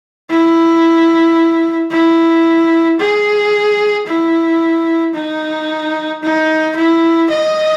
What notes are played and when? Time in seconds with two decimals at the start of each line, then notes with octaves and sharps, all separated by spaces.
0.30 E4
1.91 E4
3.00 G#4
4.07 E4
5.15 D#4
6.23 D#4
6.76 E4
7.30 D#5